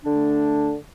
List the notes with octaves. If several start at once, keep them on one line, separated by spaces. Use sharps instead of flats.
D3 A3 D4